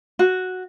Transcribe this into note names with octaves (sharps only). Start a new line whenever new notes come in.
F#4